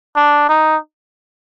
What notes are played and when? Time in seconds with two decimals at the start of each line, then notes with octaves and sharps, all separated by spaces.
0.16 D4
0.49 D#4